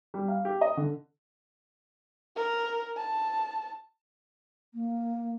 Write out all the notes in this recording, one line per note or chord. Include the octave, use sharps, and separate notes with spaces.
G3
F5
G4
D#5
D3
A#4
A5
A#3